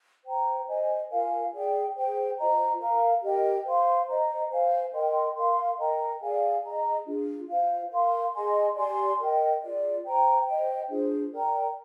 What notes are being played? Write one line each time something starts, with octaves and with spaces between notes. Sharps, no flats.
C5 G5 A#5
C5 D#5 G#5
F4 A#4 F5 G#5
G#4 D5 G5
G#4 C5 G5
F4 C5 D#5 A#5
A#4 F5 A#5
G4 A#4 D#5 G5
C5 F5 C6
C5 D#5 A#5
C5 F5 G#5
A#4 D#5 G5 C6
A#4 F5 C6
A#4 D#5 G5 A#5
G#4 D5 F5 G#5
G#4 D#5 A#5
D4 F4 G#4
F4 C5 F5
A#4 F5 C6
G#4 D#5 G#5 C6
G4 D5 G#5 C6
A#4 D#5 G5
F4 G#4 D5
C5 G5 A#5
C5 D#5 G5
D4 F4 G#4 C5
A#4 D5 G5 A#5